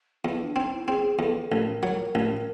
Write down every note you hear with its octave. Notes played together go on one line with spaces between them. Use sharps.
E2 E4
D4
C4 D#4
E4
C4 G#4
E2 A4
A1 A#4
F#3
A1